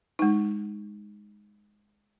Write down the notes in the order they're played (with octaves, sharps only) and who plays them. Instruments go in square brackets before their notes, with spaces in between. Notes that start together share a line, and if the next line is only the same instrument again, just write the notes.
[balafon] G#3 D#4